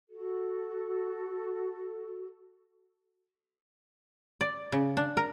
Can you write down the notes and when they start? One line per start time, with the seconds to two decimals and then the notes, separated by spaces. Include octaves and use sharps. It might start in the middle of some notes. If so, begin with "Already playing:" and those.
0.09 F#4 A4
4.41 D5
4.72 C#3
4.97 D4
5.17 A#4